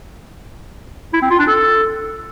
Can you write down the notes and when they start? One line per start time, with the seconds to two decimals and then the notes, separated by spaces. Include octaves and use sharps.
1.13 E4
1.22 C4
1.30 F4
1.39 D4
1.47 A4